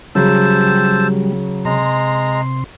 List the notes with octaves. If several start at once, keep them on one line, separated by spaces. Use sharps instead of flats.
C#3 F#3 G3 C5 A5 E6
C3 G#3 A#5 C6